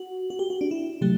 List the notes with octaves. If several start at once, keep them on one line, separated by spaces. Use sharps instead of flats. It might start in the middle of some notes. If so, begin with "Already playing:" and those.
Already playing: F#4
F#4
G4
F#4
D4
E4
C3 F#3 A3 G4